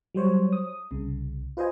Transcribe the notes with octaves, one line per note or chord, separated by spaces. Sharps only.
F#3 G3 C5 C#5
D#6
C2 C#3
F4 B4 C5 D#5 G#5